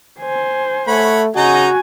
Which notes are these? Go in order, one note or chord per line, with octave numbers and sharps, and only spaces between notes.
C5 G#5
A3 C#5 F#5 B5
C#3 D#4 F#4 D#5 G#5 A#5